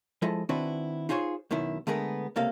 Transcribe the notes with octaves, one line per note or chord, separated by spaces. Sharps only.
F3 G#3 E4 A4 D#5
D#3 C4 D4 E4 F#4 B4
D#4 F4 G#4 C5 C#5
F#2 B2 D#3 E4
D3 G#3 A3 B3 G#4 A#4
C#2 C3 A#3 A4 F5